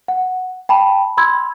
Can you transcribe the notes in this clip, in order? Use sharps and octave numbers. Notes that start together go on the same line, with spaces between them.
F#5
G5 A5 B5
B5 C6 E6 G#6